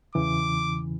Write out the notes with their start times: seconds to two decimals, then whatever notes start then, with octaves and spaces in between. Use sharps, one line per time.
0.15 E2 C#3 E3 D6